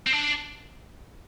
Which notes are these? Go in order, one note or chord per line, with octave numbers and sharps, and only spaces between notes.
C4
D4